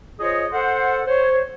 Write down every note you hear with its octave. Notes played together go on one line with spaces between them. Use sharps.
F4 G#4 C5 C#5 D#5
A4 C5 F#5
C5 C#5